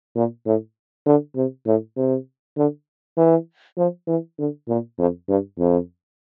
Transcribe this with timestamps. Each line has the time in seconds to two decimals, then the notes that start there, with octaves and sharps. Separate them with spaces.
0.16 A#2
0.46 A2
1.06 D3
1.36 C3
1.66 A2
1.97 C3
2.57 D3
3.17 E3
3.77 F3
4.07 E3
4.38 D3
4.68 A#2
4.98 F2
5.28 G2
5.59 F2